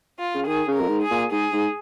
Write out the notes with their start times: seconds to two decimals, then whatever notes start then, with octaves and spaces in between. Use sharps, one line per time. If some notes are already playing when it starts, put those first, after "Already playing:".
0.19 F4
0.35 C#3
0.46 D#3 G#4
0.67 C#3
0.75 A#4
0.81 F2
0.89 G#2
1.03 G#4
1.11 A#2
1.31 G#2 G#4
1.52 G#2